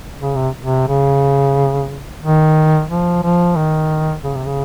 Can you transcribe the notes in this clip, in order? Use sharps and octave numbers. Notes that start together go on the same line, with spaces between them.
C#3
C3
C3
C#3
D#3
F3
F3
D#3
C#3
C3
C#3